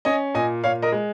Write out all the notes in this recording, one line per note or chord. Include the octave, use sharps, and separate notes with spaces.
C#4 D#5 G#5
A#2 D#5 G#5
A#2 C#5 F5
A#4 D#5
G#3